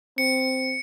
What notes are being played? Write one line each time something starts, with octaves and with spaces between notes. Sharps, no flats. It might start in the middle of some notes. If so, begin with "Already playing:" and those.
C4 C#7